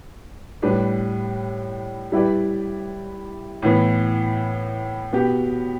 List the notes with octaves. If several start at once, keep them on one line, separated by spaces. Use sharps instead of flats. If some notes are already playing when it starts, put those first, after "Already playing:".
A2 G3 D4 B4
G3 E4 G4 B4 D5
A2 E3 B3
B2 B3 G4